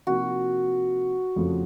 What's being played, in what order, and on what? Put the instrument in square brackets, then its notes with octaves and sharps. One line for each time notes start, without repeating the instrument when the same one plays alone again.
[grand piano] C3 F3 A#3 D#4 [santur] F#4
[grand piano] F2 C#3 F3 A3 C#4